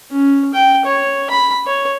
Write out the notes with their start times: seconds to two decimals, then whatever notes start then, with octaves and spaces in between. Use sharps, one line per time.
0.11 C#4
0.54 G5
0.86 C#5
1.30 B5
1.66 C#5